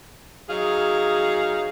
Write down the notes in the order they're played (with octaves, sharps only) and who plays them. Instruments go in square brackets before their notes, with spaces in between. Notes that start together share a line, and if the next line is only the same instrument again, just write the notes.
[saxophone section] F#3 D#4 G#4 F5